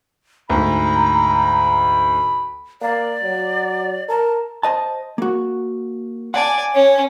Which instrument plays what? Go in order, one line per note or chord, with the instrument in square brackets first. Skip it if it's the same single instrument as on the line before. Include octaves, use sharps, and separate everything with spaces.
[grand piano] D2 G#2 [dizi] A#5 [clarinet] B5
[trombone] A#3 [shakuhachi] D5
[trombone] F#3
[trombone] A#4 [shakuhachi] A5
[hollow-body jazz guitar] C5 D#5 A5
A#3 F#4
[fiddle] D5 G#5 [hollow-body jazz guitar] F#5 A5
[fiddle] C#4 [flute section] C#5